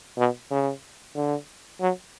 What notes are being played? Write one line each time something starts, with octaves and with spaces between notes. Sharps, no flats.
B2
C#3
D3
F#3